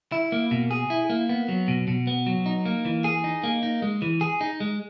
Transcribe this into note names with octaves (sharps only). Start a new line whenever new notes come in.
E4
A#3
B2
G#4
E4
A#3
B3
F#3
B2
B2
B3
F#3
D#4
A#3
E3
G#4
D#4
A#3
D#4
G#3
E3
G#4
D#4
G#3